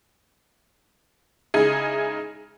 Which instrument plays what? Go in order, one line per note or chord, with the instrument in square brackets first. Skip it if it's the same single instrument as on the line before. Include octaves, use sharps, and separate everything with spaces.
[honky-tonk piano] C#3 G#3 D#4 E4 G#4